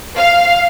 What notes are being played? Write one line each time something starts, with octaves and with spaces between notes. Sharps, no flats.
F5